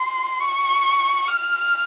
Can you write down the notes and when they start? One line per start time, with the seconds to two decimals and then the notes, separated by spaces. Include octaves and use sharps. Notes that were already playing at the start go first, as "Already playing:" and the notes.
Already playing: C6
0.40 C#6
1.28 F6